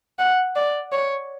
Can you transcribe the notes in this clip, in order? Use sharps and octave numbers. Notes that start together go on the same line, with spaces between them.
F#5
D5
C#5